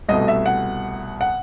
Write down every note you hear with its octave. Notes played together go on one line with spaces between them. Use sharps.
C2 B2 A3 D#5
E5
F#5
F#5